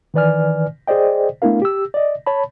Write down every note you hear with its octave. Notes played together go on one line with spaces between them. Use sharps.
D#3 E3 B4 D5 G#5 F6
G#4 C5 D5 D#5 G5
A3 B3 D4 E4 A#4 F5
G4 E6
D5 D#5
C#5 A5 B5